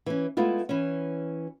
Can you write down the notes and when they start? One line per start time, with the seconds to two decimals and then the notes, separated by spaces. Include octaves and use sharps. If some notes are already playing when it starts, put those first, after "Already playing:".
0.06 E3 C#4
0.37 G#3 A3 B3 E4 F4
0.69 E3 C#4